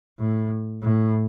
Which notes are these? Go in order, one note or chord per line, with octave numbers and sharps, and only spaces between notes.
A2
A2